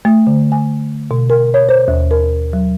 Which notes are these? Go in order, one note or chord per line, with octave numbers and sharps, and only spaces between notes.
A3
D3
G#5
B2
A#4
C#5
C5
D#2
A#4
F#3